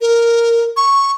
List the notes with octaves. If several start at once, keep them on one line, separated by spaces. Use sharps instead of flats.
A#4
C#6